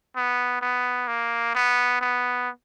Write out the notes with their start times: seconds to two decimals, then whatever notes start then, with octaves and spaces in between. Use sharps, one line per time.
0.16 B3
0.62 B3
1.08 A#3
1.55 B3
2.01 B3